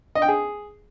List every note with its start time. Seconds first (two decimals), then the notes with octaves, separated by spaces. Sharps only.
0.15 D#5
0.22 G5
0.28 G#4